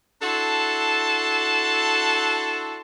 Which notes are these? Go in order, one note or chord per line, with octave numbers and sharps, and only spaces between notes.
D4 E4 F#4 A4 A5 C6